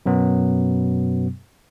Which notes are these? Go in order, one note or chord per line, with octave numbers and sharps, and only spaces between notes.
F#2 B2 F#3 B3